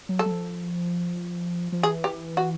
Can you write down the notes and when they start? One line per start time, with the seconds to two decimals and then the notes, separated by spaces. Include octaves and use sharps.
0.09 F#3
0.19 A4
0.26 F#3
0.31 F3
1.72 F3
1.83 E3 G#4
2.04 G4
2.37 F#4